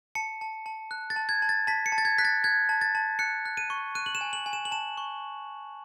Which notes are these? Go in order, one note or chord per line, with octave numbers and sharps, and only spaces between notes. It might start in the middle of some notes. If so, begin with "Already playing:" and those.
A5 C#7
A5
A5
F#6
A6
A5
G#6
A5
A6
A5 B6
C#7
A5
A6
G#6
F#6 B6
A6
F#6 G#6
A5
A6
A5
F#6 C#7
F#6
D#7
C#6
F#6 D#7
F#7
E7
G#5
F#7
G#5
E7
F#7
A5 E7
C#6